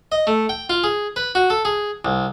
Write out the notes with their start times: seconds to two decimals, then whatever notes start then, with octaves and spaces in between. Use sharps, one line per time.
0.12 D#5
0.27 A3
0.49 G5
0.70 F4
0.84 G#4
1.16 B4
1.35 F#4
1.50 A4
1.65 G#4
2.05 C2